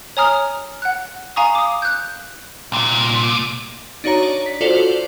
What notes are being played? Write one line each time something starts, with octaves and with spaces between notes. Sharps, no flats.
C#5 G#5 A#5 D#6 F6
F#5 F#6
F5 G#5 A#5 C#6 D#6
D6 D#6
F#6 G6
C2 A#2
D4 D#4 F#4 C#5 A#5
D5
B6
F4 F#4 A4 C5 D5